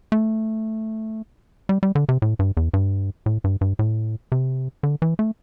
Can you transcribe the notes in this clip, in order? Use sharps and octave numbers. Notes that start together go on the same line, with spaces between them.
A3
G3
G3
D3
C3
A2
G2
E2
G2
A2
G2
G2
A2
C3
D3
E3
A3